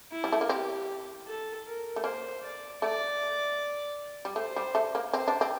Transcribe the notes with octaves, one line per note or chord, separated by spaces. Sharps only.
E4
G3
A3
A#3
C4 G4
A4
A#4
A3
A#3 C5
D5
A3 D5
G3
A3 C5
G3
A3
A#3
C4 C5
D4
C4